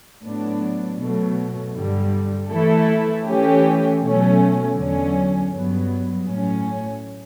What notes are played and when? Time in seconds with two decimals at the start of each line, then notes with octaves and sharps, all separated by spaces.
0.25 A2 F#3 B3 D4
1.00 B2 F#3 A3
1.75 G2 D3 G3
2.50 E3 A3 E4 A4
3.26 E3 A3 C#4 G4
4.02 B2 F#3 A3 C#4
4.77 E2 D3 F#3 C#4
5.53 G2 F#3 B3
6.28 A2 F#3 C#4